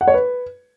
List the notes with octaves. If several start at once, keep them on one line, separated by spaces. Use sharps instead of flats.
F#5
C#5
B4